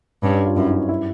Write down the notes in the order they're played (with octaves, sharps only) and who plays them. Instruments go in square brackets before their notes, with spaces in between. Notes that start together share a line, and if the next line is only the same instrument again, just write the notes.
[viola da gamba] G2 [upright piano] C#4
[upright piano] D4
F4
[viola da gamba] F#2 [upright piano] E4
[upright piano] D#4
E4
E4